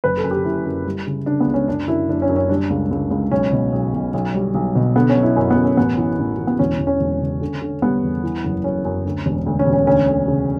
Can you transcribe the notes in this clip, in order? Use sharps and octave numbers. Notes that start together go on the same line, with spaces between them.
F#1 B4
A4
F#2
G4
F#1 E4
F#2
G3
C#3
C#3 D4
B3
C#2
C#4
F#2 D4
F#2 E4
F#1 D4
C#4
F#2
C#4
G3 D4
C#2
C#2
C#2
B1 C#4
B2
B1
B1
B1
G3
B1
B2
D3 B3
C#4
F#3
E4
F#2 C#4
B3
F#2
C#4
A1 B3
E3
A1
E3
B3
E1 C#4
E1
C#4
E1
C#3
D3
D3
G3 B3
E2
E3
F#1
F#2 C#4
F#2
D2
E1
D2
C#4
E1
C#4
D2 C#4
D2
C#3